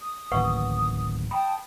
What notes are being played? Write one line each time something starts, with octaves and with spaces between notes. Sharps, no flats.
D#6
D1 A1 D#2 B4 F#5 C#6
G5 A5 B5 D#6